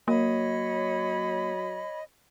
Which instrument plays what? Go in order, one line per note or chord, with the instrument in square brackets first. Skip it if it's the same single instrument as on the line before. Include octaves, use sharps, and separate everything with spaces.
[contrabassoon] F#3 [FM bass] A#3 [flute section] C#5 B5 [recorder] D#5